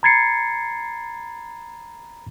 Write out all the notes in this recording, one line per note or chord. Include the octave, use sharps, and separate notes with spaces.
A#5 B5 G#6 A6 C7 C#7